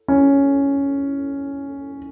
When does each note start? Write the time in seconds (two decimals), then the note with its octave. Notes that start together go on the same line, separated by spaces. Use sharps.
0.08 C#4